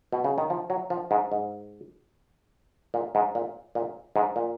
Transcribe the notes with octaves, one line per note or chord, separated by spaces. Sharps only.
B2
C#3
D#3
F3
F#3
F3
G#2
G#2
A#2
G#2
A#2
A#2
G#2
A#2